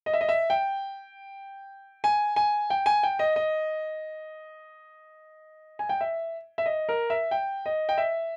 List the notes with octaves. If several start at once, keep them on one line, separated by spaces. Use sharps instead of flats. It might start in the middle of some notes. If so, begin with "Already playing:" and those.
D#5
E5
D#5
E5
G5
G#5
G#5
G5
G#5
G5
D#5
D#5
G#5
G5
E5
E5
D#5
A#4
E5
G5
D#5
G5
E5